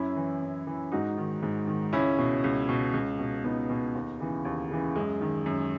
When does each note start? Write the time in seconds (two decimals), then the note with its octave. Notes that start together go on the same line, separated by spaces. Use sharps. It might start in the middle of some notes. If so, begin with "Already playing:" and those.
Already playing: F#2 C#4 E4
0.16 E3
0.42 F#2
0.67 E3
0.92 G#2 D#4 F#4
1.18 D#3
1.43 G#2
1.67 D#3
1.93 C#2 C#4 E4
2.18 B2
2.44 C#2
2.69 B2
2.93 C#2
3.19 B2
3.44 C#2 B3 D#4
3.70 B2
3.95 D#2
4.20 C#3 E3
4.45 D#2
4.71 C#3 E3
4.96 F#2 G#3
5.21 D#3
5.46 F#2